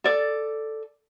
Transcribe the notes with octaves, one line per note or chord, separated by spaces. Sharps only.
A4 D5